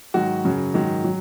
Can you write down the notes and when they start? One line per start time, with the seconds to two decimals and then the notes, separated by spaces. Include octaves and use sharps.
0.14 G#2 D#3 F#3 F#4
0.44 F#2 C#3 F#3
0.74 G#2 D#3 F#3
1.04 F#3